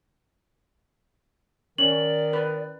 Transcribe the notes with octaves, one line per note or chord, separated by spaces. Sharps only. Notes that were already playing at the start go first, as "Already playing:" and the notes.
D#3 C#4 D5 F#7
B4